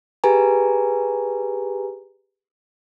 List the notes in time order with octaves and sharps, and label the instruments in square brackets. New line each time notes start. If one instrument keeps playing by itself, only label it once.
[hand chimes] G4 G#4 B4 G#5 A#5